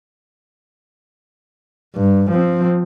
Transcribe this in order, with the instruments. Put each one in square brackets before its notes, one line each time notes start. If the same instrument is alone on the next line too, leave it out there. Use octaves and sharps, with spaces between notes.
[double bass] G2
F3 C4